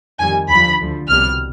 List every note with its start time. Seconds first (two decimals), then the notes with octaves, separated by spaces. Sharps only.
0.20 F2 D#3 G3 G#5
0.49 D#2 D3 F3 B5
0.79 D2 D3 F3
1.09 C2 B2 G3 F6